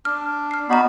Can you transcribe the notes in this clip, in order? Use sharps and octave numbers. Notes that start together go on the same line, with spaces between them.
D4 F6
F6 C7
B3 D#4 F#4 D5 D#5 A#5 B5